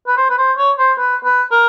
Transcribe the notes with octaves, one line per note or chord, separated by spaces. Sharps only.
B4
C5
B4
C5
C#5
C5
B4
B4
A#4